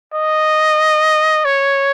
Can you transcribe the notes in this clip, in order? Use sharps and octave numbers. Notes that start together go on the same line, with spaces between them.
D#5
C#5